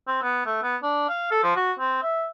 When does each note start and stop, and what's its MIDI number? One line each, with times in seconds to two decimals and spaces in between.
0.07 0.18 60
0.23 0.44 59
0.46 0.62 57
0.63 0.77 59
0.83 1.07 62
1.09 1.30 77
1.31 1.42 69
1.43 1.53 53
1.57 1.72 66
1.79 2.03 60
2.03 2.26 76